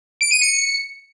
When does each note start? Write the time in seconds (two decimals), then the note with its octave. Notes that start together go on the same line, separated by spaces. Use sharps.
0.21 D7
0.31 D#7
0.41 C#7